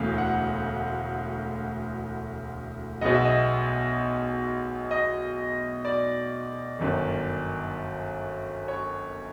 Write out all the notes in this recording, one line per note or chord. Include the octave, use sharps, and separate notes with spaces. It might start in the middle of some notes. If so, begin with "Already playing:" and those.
Already playing: E1 D2 C#3 E3 F5
F#5
B1 B2 G#3 B3 D#5
E5
D#5
D#5
D5
G1 F#2 D#3
C#5